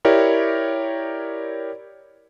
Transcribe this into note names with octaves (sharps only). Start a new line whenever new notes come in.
E4 G4 A#4 C#5 D5